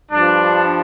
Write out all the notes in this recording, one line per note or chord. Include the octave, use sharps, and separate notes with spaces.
G2 F3 D4